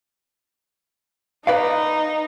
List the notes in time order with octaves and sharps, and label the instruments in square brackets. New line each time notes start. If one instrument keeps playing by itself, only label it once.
[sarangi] D#4 [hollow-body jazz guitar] B4 D5 F5